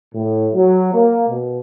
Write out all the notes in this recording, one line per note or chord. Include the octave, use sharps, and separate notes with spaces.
A2
F#3
A#3
B2